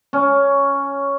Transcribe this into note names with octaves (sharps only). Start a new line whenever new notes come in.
C#4